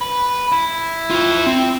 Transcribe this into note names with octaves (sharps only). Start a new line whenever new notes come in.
B4
E4
F4 G5
C4